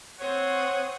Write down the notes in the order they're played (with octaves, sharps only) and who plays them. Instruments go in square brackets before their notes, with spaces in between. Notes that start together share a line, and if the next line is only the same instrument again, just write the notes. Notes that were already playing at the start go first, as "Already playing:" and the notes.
[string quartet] C4 C5 D#6 [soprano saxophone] C#5 [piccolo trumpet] F#5